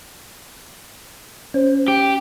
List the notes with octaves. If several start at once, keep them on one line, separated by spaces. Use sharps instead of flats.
C#4 C5
G4